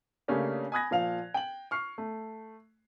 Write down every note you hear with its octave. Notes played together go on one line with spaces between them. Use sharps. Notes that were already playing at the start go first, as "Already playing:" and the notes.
C#3 A3 A#3 C#4 D4 G4
G#5 B5 D#6 F#6 G#6 A#6
A#2 F3 F5 F7
G5 F#7
C#6 F6 C7
A3